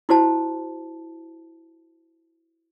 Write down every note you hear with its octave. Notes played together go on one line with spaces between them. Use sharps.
E4 F#4 C5 A5